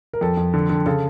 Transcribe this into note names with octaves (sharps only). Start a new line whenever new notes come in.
A#4
F2 A4
F2
D3
D3
C#3 A4